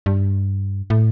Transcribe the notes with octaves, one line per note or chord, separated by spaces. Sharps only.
G2
A2